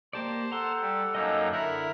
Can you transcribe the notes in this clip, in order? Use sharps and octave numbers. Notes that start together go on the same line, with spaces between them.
A#3 G4 C5 D5 A5
A4 F#5 A#5 C6
G3
F#2 A#3 D#4 D#5 A5 E6
D3 E4 A#4 E5 F#6